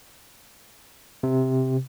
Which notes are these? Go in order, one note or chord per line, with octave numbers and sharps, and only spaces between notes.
C3